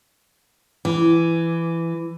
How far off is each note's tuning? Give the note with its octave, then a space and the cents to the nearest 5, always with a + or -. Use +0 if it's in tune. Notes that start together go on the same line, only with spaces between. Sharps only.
E3 +15